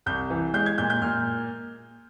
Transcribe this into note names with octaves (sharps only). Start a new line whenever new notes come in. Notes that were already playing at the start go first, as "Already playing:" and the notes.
C2 G6
E3
G#3 G6
G#6
A#2 G6
G6
A#2 F6